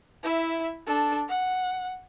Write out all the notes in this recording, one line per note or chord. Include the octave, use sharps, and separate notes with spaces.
E4 E5
D4 A4
F#5